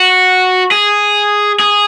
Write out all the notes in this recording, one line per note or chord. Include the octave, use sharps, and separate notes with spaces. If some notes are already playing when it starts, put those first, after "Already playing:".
Already playing: F#4
G#4
G#4